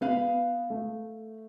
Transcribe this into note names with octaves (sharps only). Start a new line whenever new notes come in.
B3 B4 F5 B5
A3